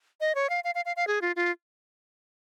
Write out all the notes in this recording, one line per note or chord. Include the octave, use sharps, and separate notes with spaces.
D#5
C#5
F5
F5
F5
F5
F5
G#4
F4
F4